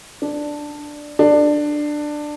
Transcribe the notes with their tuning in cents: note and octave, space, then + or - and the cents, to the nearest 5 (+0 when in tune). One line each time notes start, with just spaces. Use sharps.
D4 +5
D4 +15